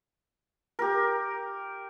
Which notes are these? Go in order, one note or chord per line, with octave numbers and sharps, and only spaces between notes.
G4 A#4